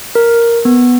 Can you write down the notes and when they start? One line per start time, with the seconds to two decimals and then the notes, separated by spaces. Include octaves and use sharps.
0.15 A#4
0.65 B3